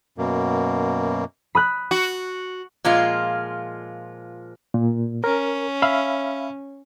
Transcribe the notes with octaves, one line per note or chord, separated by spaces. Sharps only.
F#2 B2 A#3
B5 D#6 F#6
F#4
A#2 F3 G#3 F4
A#2
C#4 A#4
E5 F5 B5